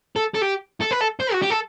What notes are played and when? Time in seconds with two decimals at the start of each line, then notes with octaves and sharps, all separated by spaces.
0.16 A4
0.35 A4
0.42 G4
0.81 A4
0.91 B4
1.01 A4
1.20 C5
1.33 F#4
1.42 G4
1.50 A4